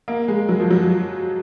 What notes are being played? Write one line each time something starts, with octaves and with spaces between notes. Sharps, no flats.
A#3
G#3
F#3
F3
F#3